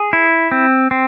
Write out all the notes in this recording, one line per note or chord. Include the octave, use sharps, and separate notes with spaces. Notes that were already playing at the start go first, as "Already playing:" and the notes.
Already playing: G#4
E4
C4
C4